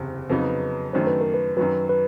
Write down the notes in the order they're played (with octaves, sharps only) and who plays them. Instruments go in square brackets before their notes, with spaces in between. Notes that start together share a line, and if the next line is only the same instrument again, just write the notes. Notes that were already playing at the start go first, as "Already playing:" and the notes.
Already playing: [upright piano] F#1 E2 C3
[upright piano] F2 C#3 F#3 B3 D#4 [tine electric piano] B4
[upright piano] F#2 D#3 F#3 A3 D4 [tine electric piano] C5
[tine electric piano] B4
A#4
B4
[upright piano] F#2 D#3 F#3 [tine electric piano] B4
[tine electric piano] B4